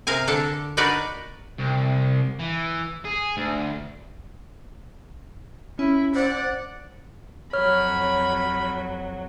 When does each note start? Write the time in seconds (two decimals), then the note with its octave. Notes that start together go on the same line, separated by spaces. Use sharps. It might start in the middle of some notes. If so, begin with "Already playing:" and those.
0.07 C3 G#4 A#4 F5 G#5
0.28 D3 D4 A4 A5
0.77 D4 D#4 F#4 A#4 B4 D5
1.58 C2
2.39 E3
3.05 G#4
3.38 D2
5.79 C#4 E4
6.15 C5 D5 F#5
7.53 F2 F#3 C#5 B5 F6